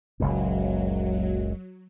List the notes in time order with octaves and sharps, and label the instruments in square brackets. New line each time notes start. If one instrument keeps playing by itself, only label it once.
[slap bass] F#1 C#2 A#2 [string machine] F#3